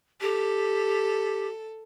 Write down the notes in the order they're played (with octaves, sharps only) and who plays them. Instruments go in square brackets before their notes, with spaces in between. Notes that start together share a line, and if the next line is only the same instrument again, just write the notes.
[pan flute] G4 [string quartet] A4